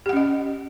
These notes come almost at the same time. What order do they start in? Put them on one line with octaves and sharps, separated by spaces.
G4 F#5 C#4 D#5